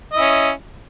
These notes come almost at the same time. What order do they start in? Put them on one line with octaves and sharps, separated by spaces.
D#5 E4 C#4